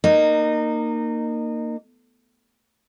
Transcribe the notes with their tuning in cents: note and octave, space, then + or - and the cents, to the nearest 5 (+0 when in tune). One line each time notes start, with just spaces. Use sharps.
A#3 -5 D#4 -25